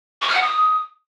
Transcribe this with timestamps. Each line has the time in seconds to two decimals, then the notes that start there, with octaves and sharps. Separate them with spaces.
0.22 C#6
0.28 F6
0.35 F#5
0.42 D#6